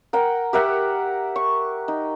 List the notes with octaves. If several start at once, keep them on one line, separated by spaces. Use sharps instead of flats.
A#4 F#5 G5
G4 A#4 E5 F#5
C#6
D#4